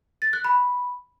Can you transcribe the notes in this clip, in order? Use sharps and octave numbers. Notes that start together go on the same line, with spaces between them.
A6
F#6
B5